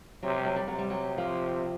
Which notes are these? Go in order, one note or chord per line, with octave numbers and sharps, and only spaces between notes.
C3 F#3
G3
F#3
G3
C3 F#3
G3
F#3
F3